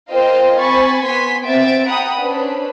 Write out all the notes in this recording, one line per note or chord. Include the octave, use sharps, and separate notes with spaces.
F4 A#4 C5 D#5 F5 G5
C4 C5 G#5 B5 C#6 A6
B3 G#5 C6 B6
B3 C4 E5 A6 D7
F#5 G5 A#5 B5 D#6
C#4 D4 B4 C5